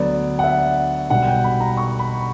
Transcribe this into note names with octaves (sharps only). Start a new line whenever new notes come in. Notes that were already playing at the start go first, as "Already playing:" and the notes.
Already playing: D2 D3 F#3 B3 D5
F#5
E5
B1 B2 G3 F#5
G5
B5
A#5
C#6
B5